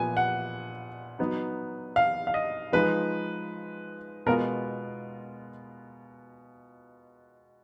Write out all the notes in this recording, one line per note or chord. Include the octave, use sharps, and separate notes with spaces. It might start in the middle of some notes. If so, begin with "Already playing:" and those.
Already playing: A#2 F3 B3 G#5
F#5
F#3 B3 D#4
F5
F5
D#5
F3 G#3 D#4 B4
B2 G#3 B3 F4 A#4